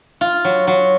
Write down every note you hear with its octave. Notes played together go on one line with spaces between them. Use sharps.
F4
F#3
F#3